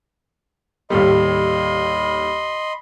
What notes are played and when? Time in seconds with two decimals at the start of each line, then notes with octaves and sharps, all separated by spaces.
0.90 D#2 A2 G3 D#5 B5 C6